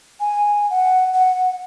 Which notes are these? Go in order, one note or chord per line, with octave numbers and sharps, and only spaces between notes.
G#5
F#5
F#5